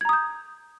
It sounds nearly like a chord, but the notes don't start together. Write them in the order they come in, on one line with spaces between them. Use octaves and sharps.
G#6 A#5 D#6 G6